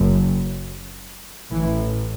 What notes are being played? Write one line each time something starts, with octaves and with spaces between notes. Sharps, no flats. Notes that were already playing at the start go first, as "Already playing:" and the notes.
Already playing: F#1 F#2
A1 A2 E3